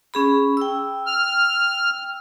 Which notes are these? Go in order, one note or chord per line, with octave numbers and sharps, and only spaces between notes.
C#4 G#4 B5
G5 E6
F6